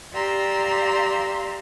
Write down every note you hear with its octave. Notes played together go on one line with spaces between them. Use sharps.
G4 D5 F5 A#5 C6 E6